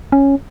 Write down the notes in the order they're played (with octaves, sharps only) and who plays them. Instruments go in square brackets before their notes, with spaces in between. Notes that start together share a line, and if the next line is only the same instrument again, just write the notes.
[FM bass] C#4